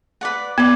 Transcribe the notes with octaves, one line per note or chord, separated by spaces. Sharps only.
B4 D5 F#5
B3 B4 D5